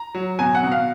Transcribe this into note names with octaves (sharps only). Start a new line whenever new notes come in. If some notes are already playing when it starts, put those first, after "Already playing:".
Already playing: A#5
F#3
B2 G#5
F#5
B2
F5